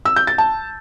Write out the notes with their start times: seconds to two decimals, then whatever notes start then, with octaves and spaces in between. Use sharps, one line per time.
0.05 E6
0.16 G6
0.27 A6
0.38 A5